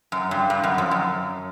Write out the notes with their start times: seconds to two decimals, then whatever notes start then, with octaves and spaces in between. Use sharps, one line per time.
0.12 F#2
0.31 G2
0.50 G2
0.63 F#2
0.78 F2
0.91 F#2